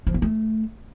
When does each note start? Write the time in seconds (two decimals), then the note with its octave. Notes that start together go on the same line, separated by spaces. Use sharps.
0.07 F3
0.14 A#3
0.22 A3